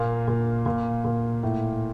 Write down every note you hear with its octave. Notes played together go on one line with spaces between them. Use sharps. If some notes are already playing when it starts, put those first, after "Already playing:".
Already playing: A#2 A#3 F5
A#2
A#2
A#2
A2